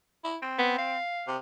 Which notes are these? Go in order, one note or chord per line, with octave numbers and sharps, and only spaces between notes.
E4
C4
B3
F5
C3